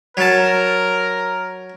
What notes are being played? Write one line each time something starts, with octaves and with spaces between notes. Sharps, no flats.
F#3 A#4 A5